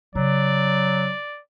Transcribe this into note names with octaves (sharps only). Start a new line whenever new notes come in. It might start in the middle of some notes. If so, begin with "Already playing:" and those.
C#3 F#3 D5